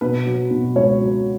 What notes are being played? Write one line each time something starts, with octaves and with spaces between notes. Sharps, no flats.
B2 B4
F#3
B2
C#2 C#5
F#3